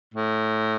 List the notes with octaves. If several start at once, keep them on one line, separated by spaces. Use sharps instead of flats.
A2